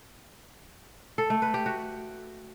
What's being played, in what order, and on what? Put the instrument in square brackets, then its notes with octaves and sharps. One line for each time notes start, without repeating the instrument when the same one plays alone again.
[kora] A4
A3
B4
G4
F#4